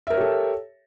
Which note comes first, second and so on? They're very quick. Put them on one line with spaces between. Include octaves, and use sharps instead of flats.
E5 A#4 C#5 G4 A4